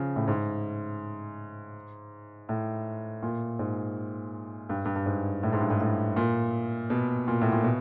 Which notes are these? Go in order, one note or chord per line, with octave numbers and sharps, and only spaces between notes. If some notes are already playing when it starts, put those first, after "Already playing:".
Already playing: C#3 F3
A2
G#2
A2
A#2
G#2
G2
G2
G2
G#2
A2
G#2
G2
G#2
A2
A#2
B2
A#2
A2
A#2
B2